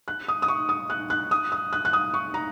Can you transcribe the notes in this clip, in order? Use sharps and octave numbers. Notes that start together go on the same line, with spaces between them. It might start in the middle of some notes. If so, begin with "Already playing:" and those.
F#6
D#6
D#6
C#6
D#6
F#6
F#6
D#6
D#6
F#6
F#6
D#6
C#6
A#5